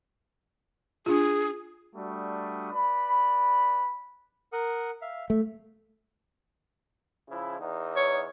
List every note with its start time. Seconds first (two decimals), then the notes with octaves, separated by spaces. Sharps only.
1.06 D4 F4 G#4
1.96 G3 A3 D4 F#4 D#6
2.72 B4 D5 B5
4.53 A#4 F#5 D#6
5.02 E5 F5
5.30 A3 E5
7.29 C#3 F3 E4
7.60 E2 D#4
7.96 C#5